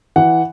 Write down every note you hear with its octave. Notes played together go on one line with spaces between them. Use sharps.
E3 F#5